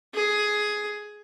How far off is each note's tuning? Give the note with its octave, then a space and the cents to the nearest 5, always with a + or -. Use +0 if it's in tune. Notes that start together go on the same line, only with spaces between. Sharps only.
G#4 +10